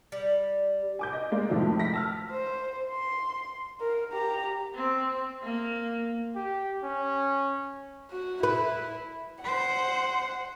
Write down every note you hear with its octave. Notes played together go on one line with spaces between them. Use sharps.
G3
G#5 D6 G6
D#5
G#3 A#3 D5
F2 A2 D#3 F3 G#3 A3
A#6 B6
A5 E6 F6
C5
C6
A#4
G4 A#5
C4
A#3
G4
C#4
F#4
E4 B4
C5 F#5